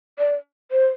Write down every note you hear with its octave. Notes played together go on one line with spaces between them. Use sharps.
D5
C5